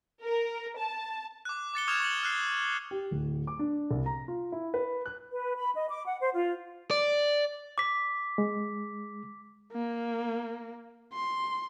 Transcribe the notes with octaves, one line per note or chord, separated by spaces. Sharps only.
A#4
A5
D6 F#6
D6 A6 C#7 G7
C#6 D#6 F6 G#6 E7 F7
C#6 C#7 F#7
F6 F#6 C7
G4
D1
D6
D4
C2
A#5
F4
E4
B4
F#6
B4
B5
D#5
D6
F#5
C5
F4
D5
D6 B6
G#3
A#3
C6